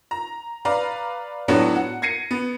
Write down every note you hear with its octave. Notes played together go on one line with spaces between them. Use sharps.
A#5
B4 D5 F5 A#5
A2 F#3 B3 D4 F#4 C#5
F#5
G#6 A#6 C7 C#7 D#7
B3